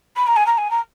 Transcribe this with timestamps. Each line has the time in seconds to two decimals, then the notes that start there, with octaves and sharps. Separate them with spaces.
0.16 B5
0.27 A#5
0.36 G#5
0.46 A#5
0.57 G#5
0.70 A#5